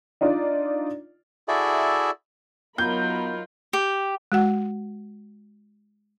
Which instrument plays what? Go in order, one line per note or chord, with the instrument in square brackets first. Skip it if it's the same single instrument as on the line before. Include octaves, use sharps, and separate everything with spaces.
[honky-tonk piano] D4 D#4 F4 D5
[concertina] E4 F#4 G#4 A4 D5 E5
[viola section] F#3 A#4 B5 [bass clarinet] B3 [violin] D#4 F4 [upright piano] G6
[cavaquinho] G4
[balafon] G#3 F#4 F#5